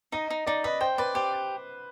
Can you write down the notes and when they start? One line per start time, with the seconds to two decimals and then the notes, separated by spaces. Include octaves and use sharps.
0.12 D#4 D#5
0.30 D#4
0.47 D#4 D5
0.64 B4 D#5
0.81 C5 G5
0.98 B4 D5
1.15 G4 C5